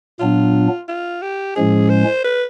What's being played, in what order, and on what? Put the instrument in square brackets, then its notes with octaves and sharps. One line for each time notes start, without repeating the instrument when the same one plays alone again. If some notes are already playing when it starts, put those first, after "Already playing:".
[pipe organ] A#2 F#3 B3 D4 [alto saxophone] F4
[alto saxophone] F4
G4
[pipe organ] A2 F3 G#3 C#4 [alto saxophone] G#4
[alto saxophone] C5
B4